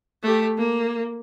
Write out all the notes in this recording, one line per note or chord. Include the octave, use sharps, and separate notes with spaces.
A3 G4
A#3